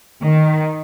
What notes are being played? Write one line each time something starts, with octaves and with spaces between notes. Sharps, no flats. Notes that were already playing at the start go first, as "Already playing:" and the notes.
D#3